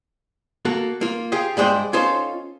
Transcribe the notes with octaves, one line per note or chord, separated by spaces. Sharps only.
A#3 F#4 A4
A#3 F4
F4 G4 G#4 F5
G2 G#3 C5 D5 G5
C#4 D#4 F4 A4 C5